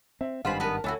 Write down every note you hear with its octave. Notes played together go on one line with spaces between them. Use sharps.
C4 E5
G#1 G2 D#3 F4 C5 F#5 G#5 B5
B3 F#4 A#4 B4 A5
D2 D4 E4 F#4 A4 C#5 G#5